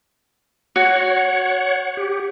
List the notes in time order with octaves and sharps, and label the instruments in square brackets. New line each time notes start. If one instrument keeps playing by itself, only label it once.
[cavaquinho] F#4 [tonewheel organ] C#5 F#5
[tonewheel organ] G4